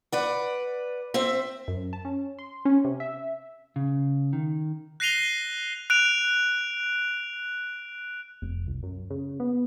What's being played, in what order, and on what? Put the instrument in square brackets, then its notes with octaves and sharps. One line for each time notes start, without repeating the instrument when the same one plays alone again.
[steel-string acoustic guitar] B4 D5 F#5
C4 C5 E5
[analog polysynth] F#2
A5
C#4
C6
C#4
C3
E5
[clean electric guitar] C#3
D#3
[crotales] F#6 A#6 C7 D#7 F7 G7
F#6 D7 F7
[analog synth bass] F1
C2
F#2
C#3
B3